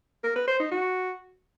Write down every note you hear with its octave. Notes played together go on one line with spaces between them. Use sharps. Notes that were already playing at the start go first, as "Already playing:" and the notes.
A#4
B4
C5
D#4
F#4